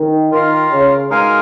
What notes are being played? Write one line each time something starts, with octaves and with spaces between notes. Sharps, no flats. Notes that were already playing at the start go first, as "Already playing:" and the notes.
Already playing: D#3
D#3 F4 A#4 F5
C#3
B2 G#3 D#4 A#4 F5 G#5